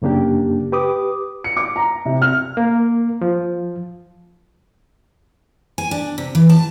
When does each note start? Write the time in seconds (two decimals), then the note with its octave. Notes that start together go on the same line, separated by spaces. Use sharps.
0.02 F#2 C#3 A#3 D4 G4
0.72 G4 B4 D6 D#6
1.44 C#7
1.57 D6
1.76 A#5
2.05 C3
2.22 F6
2.57 A#3
3.21 F3
5.78 G#5
5.91 D4
6.18 C3
6.35 E3
6.49 A5